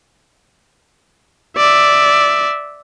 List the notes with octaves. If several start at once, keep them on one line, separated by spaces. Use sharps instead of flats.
D5 E5